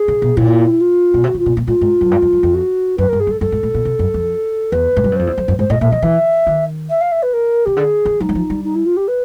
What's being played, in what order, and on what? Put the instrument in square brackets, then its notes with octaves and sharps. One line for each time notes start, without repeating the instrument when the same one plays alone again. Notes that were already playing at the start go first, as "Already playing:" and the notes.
Already playing: [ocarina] G#4
[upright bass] C#3
B2
[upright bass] A#2 [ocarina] E4
[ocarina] F4
[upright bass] B2
[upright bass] C3 [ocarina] F#4
[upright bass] C#3
[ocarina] F4
[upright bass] B2
A#2
[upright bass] A2 [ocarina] F4
[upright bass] G#2
F#2
G2
F2
F#2
F2
[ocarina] F#4
[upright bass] F#2 [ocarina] B4
[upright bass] G2 [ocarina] A#4
[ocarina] G#4
[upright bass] G2
[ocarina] A4
[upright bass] G2 [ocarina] A4
[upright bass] G#2
A2
A#2
C3
F#2
F2
[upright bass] E2 [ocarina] B4
[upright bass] G#2
G2
F#2
[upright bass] F2 [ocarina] C5
[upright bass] E2
F2
F#2
[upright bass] G#2 [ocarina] C5
[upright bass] A2 [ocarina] D#5
[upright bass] A#2 [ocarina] E5
[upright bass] E3 [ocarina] D#5
[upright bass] E3 [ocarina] E5
[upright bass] D#3
[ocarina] E5
F5
E5
B4
A#4
[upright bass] C#3 [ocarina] G4
[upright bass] D3 [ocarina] G#4
[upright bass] D#3
[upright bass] F3 [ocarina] D#4
[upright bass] F#3
F3
G3
[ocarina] D#4
E4
F4
G4
B4